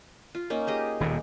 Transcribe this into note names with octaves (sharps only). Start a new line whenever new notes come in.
F4
A#3 C#4 D#4
G4 G#4 D#5
D#1 D#2 B2